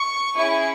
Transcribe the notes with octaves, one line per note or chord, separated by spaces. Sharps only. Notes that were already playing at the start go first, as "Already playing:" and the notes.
Already playing: C#6
C#4 E4 G#4 C#6